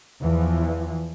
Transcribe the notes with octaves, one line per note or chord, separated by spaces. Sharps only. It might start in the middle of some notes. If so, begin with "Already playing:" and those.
E2 E3 F3